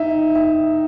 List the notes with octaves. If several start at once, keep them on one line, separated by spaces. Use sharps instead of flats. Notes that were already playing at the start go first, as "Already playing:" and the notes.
Already playing: D#4 E5
E5